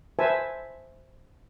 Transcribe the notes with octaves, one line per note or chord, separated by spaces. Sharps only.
B4 C5 E5 G#5 A5